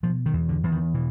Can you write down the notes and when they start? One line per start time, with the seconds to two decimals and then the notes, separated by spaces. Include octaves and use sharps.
0.03 B2 F3
0.26 D#3
0.33 E2
0.49 D3
0.63 E2
0.72 D#3
0.94 B2 E3